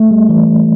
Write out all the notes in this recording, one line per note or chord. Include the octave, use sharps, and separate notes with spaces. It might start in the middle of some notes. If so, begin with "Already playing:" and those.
Already playing: A3
G3
E3